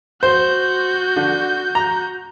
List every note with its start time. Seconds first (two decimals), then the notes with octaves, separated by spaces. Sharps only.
0.23 F#4 C5 G6
1.16 D3
1.75 A#5